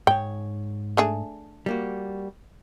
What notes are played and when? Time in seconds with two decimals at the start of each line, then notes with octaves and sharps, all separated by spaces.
0.07 G#2 C#5 G5
0.97 A3 D4 G#4
1.66 G3 A#3 F#4